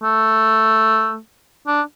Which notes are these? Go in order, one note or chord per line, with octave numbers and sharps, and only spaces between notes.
A3
D4